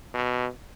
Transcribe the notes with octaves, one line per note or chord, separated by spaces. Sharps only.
B2